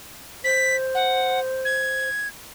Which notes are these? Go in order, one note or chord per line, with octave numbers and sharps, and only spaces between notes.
C5 B6
F#5
G#6